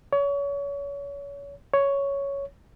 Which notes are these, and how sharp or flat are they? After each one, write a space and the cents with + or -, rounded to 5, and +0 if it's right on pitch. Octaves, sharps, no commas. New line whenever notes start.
C#5 +30
C#5 +5